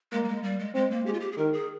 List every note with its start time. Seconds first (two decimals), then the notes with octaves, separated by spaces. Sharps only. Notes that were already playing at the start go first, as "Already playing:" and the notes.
0.12 G#3 A#3
0.24 G3
0.28 G#3
0.43 G3
0.59 G#3
0.74 G#3 C4
0.91 A#3
1.06 G#3 G4
1.14 F4
1.20 G4
1.32 G#4
1.37 D#3 A#4
1.53 G#4